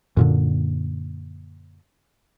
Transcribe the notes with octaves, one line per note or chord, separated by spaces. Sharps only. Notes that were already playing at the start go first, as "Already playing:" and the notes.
F#2 A#2 D3